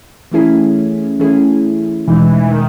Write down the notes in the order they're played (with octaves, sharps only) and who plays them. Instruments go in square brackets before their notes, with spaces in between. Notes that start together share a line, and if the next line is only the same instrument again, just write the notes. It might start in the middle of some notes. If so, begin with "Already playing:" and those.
[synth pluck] E3 A3 C#4 E4 G#4
E3 A3 C#4 E4 G#4
[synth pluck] E2 B2 G#3 D#4 [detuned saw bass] E3
[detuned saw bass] D#3